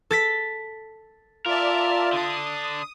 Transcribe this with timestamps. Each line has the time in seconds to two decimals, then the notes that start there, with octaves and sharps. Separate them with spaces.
0.11 A4 A6 B6
1.46 F4 A#4 D5 E5 A5
2.13 D3 D4 D#6